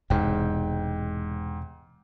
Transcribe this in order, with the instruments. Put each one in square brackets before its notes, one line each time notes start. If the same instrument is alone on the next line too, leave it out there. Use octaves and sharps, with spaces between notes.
[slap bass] E1 E2 C3 [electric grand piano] G#2 G5